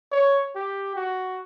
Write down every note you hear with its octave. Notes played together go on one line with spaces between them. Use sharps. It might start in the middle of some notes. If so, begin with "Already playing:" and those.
C#5
G4
F#4